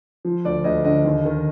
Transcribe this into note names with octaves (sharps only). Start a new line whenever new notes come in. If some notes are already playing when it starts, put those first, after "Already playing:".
F3
D2 D5
D2 D#5
D3 D#5
D#2
D#3